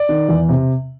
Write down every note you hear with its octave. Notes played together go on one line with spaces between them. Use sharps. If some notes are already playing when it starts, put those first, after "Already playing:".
Already playing: D5
D#3
E2
C3